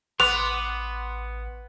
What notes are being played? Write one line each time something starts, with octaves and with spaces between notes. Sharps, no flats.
A1 B3 C6 D6 F#6 F7